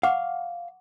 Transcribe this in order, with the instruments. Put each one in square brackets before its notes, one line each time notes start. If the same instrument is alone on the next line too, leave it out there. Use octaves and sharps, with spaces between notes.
[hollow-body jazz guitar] F5 [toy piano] F#5 C#6 D6